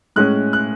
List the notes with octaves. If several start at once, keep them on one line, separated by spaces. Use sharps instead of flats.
A2 G#3 C#4 F#6
F#6